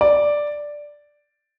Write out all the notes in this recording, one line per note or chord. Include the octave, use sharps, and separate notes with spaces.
D5